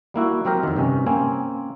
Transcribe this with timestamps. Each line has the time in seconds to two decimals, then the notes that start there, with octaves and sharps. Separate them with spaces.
0.14 G3 A#3 E4 F#4
0.45 F#3 C4 G4 A#4
0.63 F2 D#3
0.76 G2 C3 C#4
1.06 A#3 C4 C#4 G#5